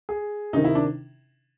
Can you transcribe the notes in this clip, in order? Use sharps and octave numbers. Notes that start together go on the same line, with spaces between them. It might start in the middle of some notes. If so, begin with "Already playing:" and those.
G#4
C3 D#3 D#4
E4
D4